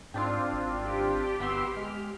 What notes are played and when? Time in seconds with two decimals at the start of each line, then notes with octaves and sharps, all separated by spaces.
0.14 G#2 C4 D4 F4
0.53 G#1
0.86 G4
1.40 G1 B3 E5 C6
1.76 G#3 F6